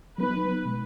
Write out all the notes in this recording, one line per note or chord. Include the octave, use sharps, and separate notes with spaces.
F#3 B3 D#4 B4
B2 G#3